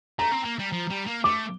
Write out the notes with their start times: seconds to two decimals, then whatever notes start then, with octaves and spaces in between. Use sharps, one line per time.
0.19 A3 A#5
0.32 C4
0.45 A#3
0.59 G3
0.72 F3
0.90 G3
1.06 A#3
1.24 A3 D6